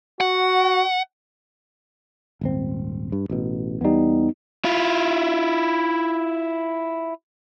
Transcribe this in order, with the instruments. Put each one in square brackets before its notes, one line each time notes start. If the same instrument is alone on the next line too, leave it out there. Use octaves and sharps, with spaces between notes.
[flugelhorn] F#4 [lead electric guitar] F#5
[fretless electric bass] D#1 G#1 C4
G2
A1 B2
[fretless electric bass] E2 G3 [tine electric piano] B3 D#4
[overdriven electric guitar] E4 F4